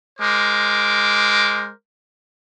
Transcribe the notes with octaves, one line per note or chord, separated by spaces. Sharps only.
G#3 A#4 C5 D6